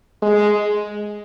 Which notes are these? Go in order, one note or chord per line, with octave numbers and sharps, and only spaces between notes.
G#3